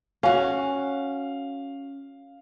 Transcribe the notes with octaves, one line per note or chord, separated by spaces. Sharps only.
C#4 F#4 F5